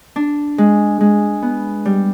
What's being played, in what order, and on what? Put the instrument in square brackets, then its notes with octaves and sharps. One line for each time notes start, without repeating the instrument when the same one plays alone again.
[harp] D4
G#3
G#3
B3
G3